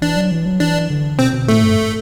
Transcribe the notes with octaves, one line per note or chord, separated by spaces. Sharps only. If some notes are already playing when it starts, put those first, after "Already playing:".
E3 D4
F#3
E3
F#3
E3 D4
D3
B2 C4
B2
A2 A3
G2